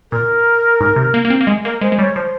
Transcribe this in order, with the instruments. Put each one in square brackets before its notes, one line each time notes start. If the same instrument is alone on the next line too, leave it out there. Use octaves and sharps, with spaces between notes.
[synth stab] A#2 [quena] A#4
[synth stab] G#2
C3
A#3
A#3
C4
A#3
G#3
[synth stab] A#3 [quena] A#4
[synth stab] G#3 [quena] C5
[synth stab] G#3
[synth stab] G3 [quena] C#5
[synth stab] F3 [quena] C5